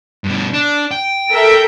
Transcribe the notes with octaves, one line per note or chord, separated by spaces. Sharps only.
G2 B2
D4
G5
A4 A#4 E5